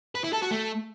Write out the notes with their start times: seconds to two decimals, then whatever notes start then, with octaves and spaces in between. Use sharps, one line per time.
0.15 B4
0.24 E4
0.33 A4
0.42 F#4
0.51 A3